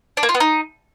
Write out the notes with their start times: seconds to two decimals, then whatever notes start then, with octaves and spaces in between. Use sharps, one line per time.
0.17 D4
0.23 A#3
0.29 F4
0.35 B3
0.40 D#4